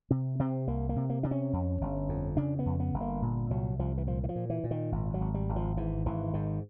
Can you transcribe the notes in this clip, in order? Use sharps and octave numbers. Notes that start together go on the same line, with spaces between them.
C3 C4
C3 C4
C2 A#3
A#3
C3
A#3
C3 D4
C#4
F2
G1
F2
C#3 D4
B3
F2
B3
G1
A#3
A#2
C2 F#3
C2 F3
E3
A#2 F3
E3
F3
A#2
E3
A#2
D#3
G#1
F#3
G#1
G3
G#1
F3
G#2 E3
G#1 E3
G#2 D#3